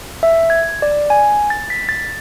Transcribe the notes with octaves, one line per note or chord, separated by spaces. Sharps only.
E5
G#6
D5
G#5
A6
B6
A6